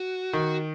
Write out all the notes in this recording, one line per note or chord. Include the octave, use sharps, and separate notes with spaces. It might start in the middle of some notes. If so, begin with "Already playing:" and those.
Already playing: F#4
D#3